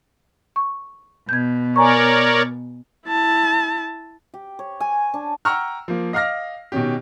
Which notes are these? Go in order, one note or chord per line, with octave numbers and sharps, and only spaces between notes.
C#6
B2 G6 G#6
A#4 C#5 D5 G#5 A#5 C#6
E4 A5
G4
C#5
G#5
D4
F#5 G5 A#5 C#6 E6 F6
F3 A#3
D#5 F5 D6 F6 A#6
B2 D#3 C#4 G4